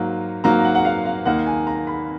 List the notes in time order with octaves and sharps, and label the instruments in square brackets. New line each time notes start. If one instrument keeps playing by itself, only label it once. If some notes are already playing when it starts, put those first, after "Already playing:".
Already playing: [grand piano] G#2 F#3 A#3
G#2 F#3 A#3 A#5
F#5
F#5
F5
F5
D#2 D#3 A#3 D#4 F#5
G#5
A#5
B5